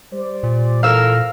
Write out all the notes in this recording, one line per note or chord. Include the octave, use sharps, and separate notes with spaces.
G3 C5 D5
A#2
E3 A4 A#4 F5 E6 F6